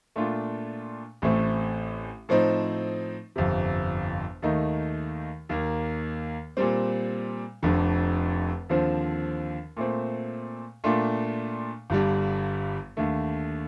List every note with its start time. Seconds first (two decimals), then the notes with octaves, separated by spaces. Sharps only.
0.16 A#2 A3 D4 F4
1.22 A1 A2 A3 C4
2.29 A2 F3 C4 D#4
3.36 G1 F2 C3
4.42 D#2 D#3 A3 D#4
5.49 D#2 D#3 A#3
6.57 A#2 G3 C4
7.63 F1 F2 D3
8.69 D#2 D3 F3 C4
9.77 A#2 A3 C4
10.84 A#2 A3 D4 F4
11.90 G1 G2 D3 G3
12.97 D#2 D3 A3